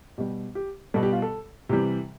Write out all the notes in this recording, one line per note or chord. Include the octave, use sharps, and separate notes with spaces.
B2 G3 G4
G4
B2 G3 A4
G4
F4
A4
C3 E3 G3 G4